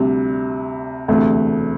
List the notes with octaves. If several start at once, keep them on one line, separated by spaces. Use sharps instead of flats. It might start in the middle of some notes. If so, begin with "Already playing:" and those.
Already playing: D2 C3 G3
E1 D2 C3 A3